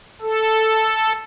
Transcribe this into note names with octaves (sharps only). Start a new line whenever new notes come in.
A4